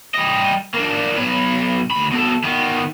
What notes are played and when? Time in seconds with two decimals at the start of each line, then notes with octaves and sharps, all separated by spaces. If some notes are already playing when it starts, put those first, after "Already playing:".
0.14 G3 D#5
0.74 A#3 D4
1.16 B1 B4
1.91 D2 B5
2.12 B2 A4
2.44 D#3 B3